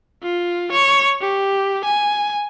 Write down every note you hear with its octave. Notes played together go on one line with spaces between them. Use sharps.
F4
C#5
G4
G#5